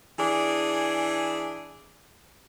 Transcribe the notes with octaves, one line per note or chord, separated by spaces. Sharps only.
E3 D4 G#4